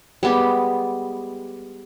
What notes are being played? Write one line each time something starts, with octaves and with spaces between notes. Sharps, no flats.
G3 G#3 B3 G4